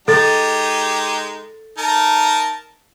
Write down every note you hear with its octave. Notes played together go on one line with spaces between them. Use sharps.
G#3 D#4 G4 A4 A6
D#4 A#4 A5